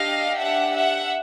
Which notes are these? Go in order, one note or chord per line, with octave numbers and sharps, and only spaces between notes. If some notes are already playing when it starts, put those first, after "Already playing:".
Already playing: D4 G4 D#5 F5
E5 F#5
E5 F#5